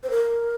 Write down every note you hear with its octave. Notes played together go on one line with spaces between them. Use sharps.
C5
A#4